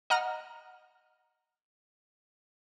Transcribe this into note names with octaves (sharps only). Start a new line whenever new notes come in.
D#5 F#5 A#5 F6